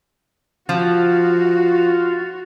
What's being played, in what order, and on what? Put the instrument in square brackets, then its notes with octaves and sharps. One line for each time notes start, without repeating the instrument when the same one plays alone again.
[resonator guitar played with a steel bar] F3 [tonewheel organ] F4 [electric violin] F#4